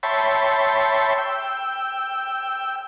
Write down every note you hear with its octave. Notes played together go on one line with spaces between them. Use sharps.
C#5 E5 G5 A5 B5 C6
G5 E6